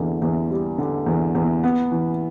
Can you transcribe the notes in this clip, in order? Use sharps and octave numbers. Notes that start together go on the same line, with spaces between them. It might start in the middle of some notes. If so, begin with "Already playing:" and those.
Already playing: E2 D3
E2
G3
D3
E2
E2
B3
E3